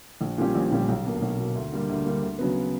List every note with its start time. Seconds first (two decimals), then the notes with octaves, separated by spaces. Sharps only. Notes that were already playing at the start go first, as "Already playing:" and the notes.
0.21 A#1
0.38 A#2 G3 C#4 G4
0.55 A#1
0.71 A#2 G3 C#4 G4
0.88 B1
1.05 B2 A#3
1.22 B1
1.38 B2 A#3
1.55 D2
1.72 D3 G3 A#3
1.89 D2
2.05 D3 G3 A#3
2.22 D2
2.39 C#3 F#3 B3